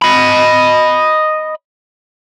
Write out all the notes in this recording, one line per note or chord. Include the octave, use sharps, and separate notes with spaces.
D#5 B5